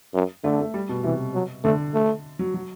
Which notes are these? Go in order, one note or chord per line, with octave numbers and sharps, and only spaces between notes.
F#2
D3 A3
A3
G3
B2
C3 E3
F#3
D3 A3
A3
F#3
F#3